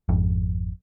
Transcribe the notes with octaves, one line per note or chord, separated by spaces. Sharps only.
G#1 F2